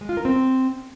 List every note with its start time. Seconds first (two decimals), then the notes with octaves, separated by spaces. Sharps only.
0.01 G#3
0.09 F4
0.17 A#4
0.25 C4